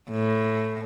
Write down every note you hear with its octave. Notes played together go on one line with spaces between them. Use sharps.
A2